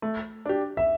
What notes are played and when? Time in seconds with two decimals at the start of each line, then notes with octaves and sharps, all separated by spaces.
0.02 A3
0.45 D4 G4
0.77 E5